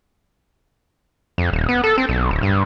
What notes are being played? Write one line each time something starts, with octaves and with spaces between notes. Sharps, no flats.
F2
D#1
B3
A4
C4
B1
D1
G2